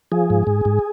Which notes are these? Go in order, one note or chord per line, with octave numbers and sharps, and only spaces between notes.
F3 G#4
G#2
G#2
G#2